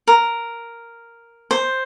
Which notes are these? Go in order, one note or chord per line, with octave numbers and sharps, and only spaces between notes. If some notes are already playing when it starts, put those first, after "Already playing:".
A#4
C5